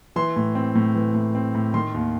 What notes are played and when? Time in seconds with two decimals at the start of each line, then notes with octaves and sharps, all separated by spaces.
0.16 E3 C6
0.36 A2
0.55 C4
0.75 A2
0.95 E3
1.14 A2
1.35 C4
1.55 A2
1.74 D#3 C6
1.94 D#2